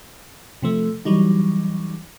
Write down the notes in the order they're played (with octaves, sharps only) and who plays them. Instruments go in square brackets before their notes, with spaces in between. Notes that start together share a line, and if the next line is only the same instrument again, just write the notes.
[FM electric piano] C3 F3 A3
E3 F#3 G3 D#4